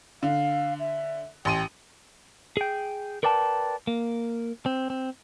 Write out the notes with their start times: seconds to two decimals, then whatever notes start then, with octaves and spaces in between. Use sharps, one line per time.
0.23 D3 F5
0.80 E5
1.45 A1 G5 C6 D#7
2.57 G#4 G5
3.23 A#4 B4 D5 G5 A5
3.87 A#3
4.66 C4
4.90 C4